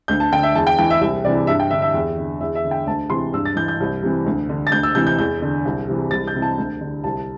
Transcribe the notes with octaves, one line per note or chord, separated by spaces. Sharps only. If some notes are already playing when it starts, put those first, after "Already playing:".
D2 G6
A5
D3 G5
E5
E2 A5
G5
E3 G5
E5
C2 E5
C3 E3 D5
G2 E5
G5
D3 E5
E5
E2
D3
E2 E5
E5
D3
G5
D2 A5
C3 E3 C6
G2 E6
A6
E3 G6
G6
C2
C3 E3
D2
D3
A6
D2 G6
E6
C3 E3 G6
G6
E2 G6
D3
C2
C3 E3
C2 A6
G6
C3 E3
A5
D2
D3
C2 A5